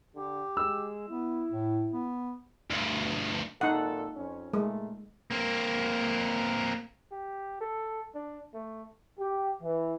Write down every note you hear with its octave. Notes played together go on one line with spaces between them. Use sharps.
D3 G4
G#3 E6
B3 E4
A2
B3
D2 G2
G#1 A#2 D#4 A4 F#5
F2 C#4
A#2 G#3 A3
A#3 C4
G4
A4
D4
A3
G4
E3